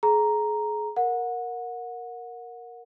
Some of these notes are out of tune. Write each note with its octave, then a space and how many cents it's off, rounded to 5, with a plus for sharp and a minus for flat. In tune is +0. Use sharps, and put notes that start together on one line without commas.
G#4 +30 A#5 +0
A#4 +0 F#5 -25